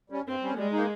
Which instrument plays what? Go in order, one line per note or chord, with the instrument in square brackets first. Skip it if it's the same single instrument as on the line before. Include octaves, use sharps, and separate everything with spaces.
[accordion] G3 C#4
[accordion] G2 [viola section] C4
[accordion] G3 C#4
[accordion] G3 [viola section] G#3
[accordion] A#3 D#4